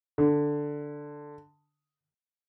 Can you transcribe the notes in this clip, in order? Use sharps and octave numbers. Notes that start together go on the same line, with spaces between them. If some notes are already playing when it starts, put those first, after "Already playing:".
D3